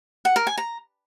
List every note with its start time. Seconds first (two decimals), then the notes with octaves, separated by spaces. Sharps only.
0.25 F#5
0.36 A#4
0.47 G#5
0.58 A#5